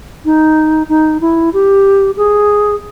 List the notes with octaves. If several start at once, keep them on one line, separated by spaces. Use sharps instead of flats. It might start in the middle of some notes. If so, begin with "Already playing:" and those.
D#4
D#4
E4
G4
G#4